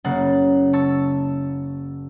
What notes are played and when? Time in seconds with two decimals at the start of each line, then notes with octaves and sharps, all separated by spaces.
0.04 F#1 C#3 A#3 F#5 A6
0.73 A5 C#6 E6 A6